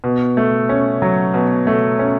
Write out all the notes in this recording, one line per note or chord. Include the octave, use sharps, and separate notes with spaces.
B2
A3
C#4
F#3
B2
A3
C#4